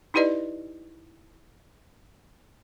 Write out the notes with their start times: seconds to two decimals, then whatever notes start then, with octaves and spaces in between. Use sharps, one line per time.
0.14 D#4 E4 G4 B4 D5 D#5